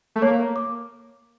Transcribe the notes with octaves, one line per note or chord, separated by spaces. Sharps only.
A3
A#3 C#5
D6